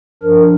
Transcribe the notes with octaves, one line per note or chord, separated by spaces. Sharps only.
G2 F3 D4 A#4